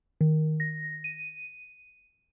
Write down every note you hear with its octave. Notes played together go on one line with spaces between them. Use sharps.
D#3
A#6
D#7